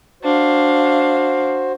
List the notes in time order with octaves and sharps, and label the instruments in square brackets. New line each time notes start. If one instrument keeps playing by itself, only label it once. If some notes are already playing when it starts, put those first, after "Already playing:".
[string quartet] D4 F5 [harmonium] F#4 C5